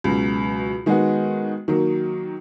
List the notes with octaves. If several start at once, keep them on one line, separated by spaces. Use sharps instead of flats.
C#2 B2 F#3
D#3 G#3 B3 F#4
D#3 F#3 A#3